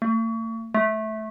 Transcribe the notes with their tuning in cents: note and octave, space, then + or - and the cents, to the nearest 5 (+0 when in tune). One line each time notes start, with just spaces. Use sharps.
A3 +45
A3 -15